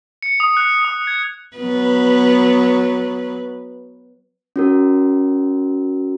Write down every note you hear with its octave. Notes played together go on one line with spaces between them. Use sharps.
C#7
D#6
F#6
D#6
G#6
F#3 B3 B4
C#4 F#4 A#4